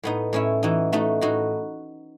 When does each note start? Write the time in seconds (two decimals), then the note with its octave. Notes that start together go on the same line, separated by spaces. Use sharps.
0.04 A2 B3 D#4
0.33 A2 C#4 E4
0.63 E3 D#4 F#4
0.92 A3 D#4 F#4
1.21 A2 D#4 F#4